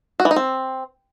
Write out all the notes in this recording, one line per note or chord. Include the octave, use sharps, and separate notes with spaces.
F#4
E3
D#4
C4